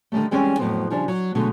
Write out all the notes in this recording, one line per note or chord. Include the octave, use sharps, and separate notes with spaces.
D3 D#3 F#3 G3 A3
E3 G3 G#3 C4 C#4
F2 A2 F#3 B3 C4
C#3 F3 G3 D4
F#3
B2 D3 F#3 G#3 A3